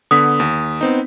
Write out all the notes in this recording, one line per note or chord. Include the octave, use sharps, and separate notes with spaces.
D3 B3 D#6 B6
D#2
B3 C4 D#4